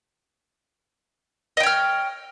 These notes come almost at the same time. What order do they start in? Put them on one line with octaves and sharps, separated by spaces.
D#5 G5 C#5 F6